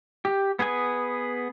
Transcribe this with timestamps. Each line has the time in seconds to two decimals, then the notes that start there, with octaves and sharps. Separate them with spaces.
0.25 G4
0.59 B3 G#4 B4 G#5